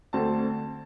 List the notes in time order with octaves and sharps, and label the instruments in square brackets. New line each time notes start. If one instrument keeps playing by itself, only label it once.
[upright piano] D2 D3 A3 C4 A5